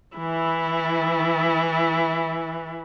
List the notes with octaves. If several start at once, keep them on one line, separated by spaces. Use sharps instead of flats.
E3 E4